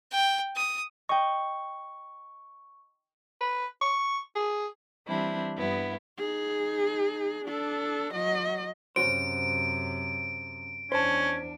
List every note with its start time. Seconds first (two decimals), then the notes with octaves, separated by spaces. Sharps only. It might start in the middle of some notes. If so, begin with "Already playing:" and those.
0.12 G5
0.56 D#6
1.09 D#5 G5 C#6
3.41 B4
3.81 C#6
4.36 G#4
5.07 E3 G3 C4 D4 E4
5.58 G2 B3 E4
6.18 D#4 G#4
7.45 D4 A4
8.13 F#3 D#5
8.96 F#2 C3 C#4 F#4 C5 D7
10.92 E2 C#4 D4 C5 A5